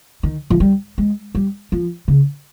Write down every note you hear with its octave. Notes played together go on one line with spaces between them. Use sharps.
D#3
F3
G3
G#3
G3
F3
C#3